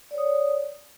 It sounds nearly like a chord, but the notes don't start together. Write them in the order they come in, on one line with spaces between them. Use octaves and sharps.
D5 C#5 D#6